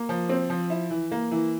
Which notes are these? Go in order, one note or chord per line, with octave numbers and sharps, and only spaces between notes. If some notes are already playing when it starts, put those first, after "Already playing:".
Already playing: A#3
F3
C4
F3
E4
E3
A#3
E3